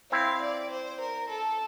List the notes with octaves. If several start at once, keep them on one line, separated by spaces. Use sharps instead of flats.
C4 E4 F5
D5
C5
A#4
A4